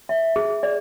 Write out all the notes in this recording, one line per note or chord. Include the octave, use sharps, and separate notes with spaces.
E5
G#4
D5